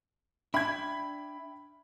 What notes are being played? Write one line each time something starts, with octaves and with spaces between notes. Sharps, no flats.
D4 E5 G5 B5 G#6